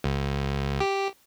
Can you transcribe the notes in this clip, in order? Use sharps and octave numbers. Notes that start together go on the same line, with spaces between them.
C#2
G4